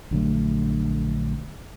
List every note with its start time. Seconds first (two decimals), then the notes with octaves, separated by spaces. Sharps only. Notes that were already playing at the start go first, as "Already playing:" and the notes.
0.11 A#1 D3 F#3 A3